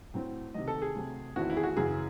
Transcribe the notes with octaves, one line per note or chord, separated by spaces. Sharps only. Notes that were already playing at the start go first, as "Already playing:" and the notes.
A2 F#3 C4
C3 D#3 F#3 D#5
A4
G#4
C3 F#3 A3
E2 D#3 A3 C4 E4 F#4
E4
G#4
F#4
F#2 C#3 E3 G#4